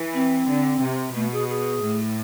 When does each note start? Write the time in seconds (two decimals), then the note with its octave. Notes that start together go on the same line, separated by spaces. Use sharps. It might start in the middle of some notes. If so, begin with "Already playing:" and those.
Already playing: E3
0.14 C4
0.47 D3
0.81 C3
1.15 B2 A3
1.33 G#4
1.49 G#4
1.83 A2